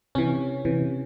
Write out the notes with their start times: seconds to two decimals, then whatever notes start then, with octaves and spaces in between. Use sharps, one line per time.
0.15 C3 E3 C#4
0.65 C3 E3